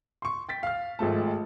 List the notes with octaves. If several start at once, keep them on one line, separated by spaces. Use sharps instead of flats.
C6 C#6
G5 A6 B6
F5 F6
G#1 F3 G#3 A3 A5